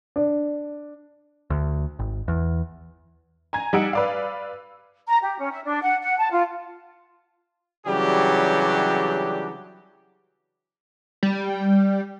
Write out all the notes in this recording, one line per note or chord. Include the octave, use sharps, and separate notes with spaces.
D4
D2
G#1
E2
G#5 A#5 G#6
G3 D#4 F#5 E6 D7
B4 D5 F5
A#5
G4
C#4
E5
D4
F#5
F#5
A5
F4
C#3 E3 F#3 G3 D4 G4
G3